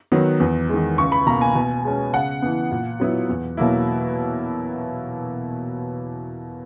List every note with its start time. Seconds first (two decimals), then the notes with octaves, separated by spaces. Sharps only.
0.12 D#3 F#3 B3
0.40 E2
0.69 D#3 G#3
0.98 C#2 C#6
1.12 B5
1.26 B2 A#3 A#5
1.41 G#5
1.55 B2
1.84 G#3 C#4
2.13 C#3 F#5
2.42 E3 B3
2.72 A#2
3.00 F#3 B3 E4
3.29 E2
3.57 B2 F#3 A#3 E4